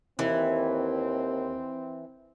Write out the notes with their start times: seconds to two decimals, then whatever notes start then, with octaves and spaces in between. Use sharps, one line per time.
0.19 D#2 E3 C4